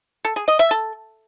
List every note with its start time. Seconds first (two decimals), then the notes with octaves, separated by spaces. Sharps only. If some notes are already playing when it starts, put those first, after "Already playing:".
0.25 A4
0.36 G#4
0.48 D#5
0.59 E5
0.71 A4